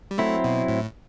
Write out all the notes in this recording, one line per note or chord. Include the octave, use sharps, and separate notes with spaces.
G3
F#3 A3 C4 E4
B2
A2